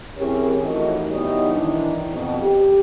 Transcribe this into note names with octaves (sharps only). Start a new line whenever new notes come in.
E3 C4 C#4 G4 G#4 A#4
E3 F3 A3 D#4 F#4 A#4
B2 E3 F#3 G3 D#4
D#3 E3 D4
F2 B2
G4